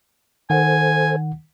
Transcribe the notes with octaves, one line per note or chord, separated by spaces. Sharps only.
D#3 A4 C5 F#5 G#5